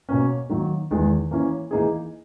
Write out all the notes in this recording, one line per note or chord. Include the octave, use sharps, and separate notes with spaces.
B2 A#3 C#4
D#3 F#3 A#3
E2 D#3 G#3
E3 A#3 C#4
E3 A#3 D#4 G#4